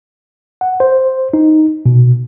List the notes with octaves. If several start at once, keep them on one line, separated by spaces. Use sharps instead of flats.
F#5
C5
D#4
B2